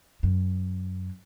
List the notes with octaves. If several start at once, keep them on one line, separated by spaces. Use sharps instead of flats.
F#2